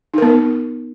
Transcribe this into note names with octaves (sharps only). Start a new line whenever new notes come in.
B3 D#4 A#4